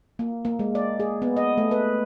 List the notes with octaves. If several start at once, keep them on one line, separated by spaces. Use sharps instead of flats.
A#3
A#3
G#3
D5
G#4
B3
D#5
A3
B4